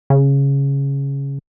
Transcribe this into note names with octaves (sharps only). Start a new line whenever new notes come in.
C#3